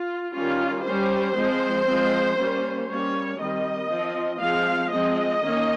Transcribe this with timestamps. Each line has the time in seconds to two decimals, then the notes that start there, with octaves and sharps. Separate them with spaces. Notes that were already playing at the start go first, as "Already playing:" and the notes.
Already playing: F4
0.34 D#3 G3 C#4 F4
0.85 G3 C#4 C5
1.36 F3 G#3 C4
1.86 F3 G#3 C4
2.38 G3 A#3 C#4
2.88 G3 A#3 C#4 C#5
3.39 D#3 G3 C4 D#5
3.91 F3 C4
4.40 F3 G#3 C4 F5
4.92 F3 G#3 C4 D#5
5.42 D#3 A#3 C#4